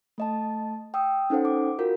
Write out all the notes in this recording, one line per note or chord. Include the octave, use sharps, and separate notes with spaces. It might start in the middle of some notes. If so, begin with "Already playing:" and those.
A3 D#5 A5
G5 D#6 E6
C#4 D#4 A4 C5 F#5
D6
F4 F#4 A#4